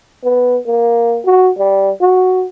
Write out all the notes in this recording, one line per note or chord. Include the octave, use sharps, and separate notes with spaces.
B3
A#3
F#4
G3
F#4